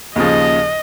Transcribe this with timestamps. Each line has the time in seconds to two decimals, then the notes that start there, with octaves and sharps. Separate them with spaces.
0.16 D#2 C#3 F3 D#5